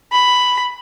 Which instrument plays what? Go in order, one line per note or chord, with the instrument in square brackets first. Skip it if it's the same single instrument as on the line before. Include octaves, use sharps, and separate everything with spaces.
[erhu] B5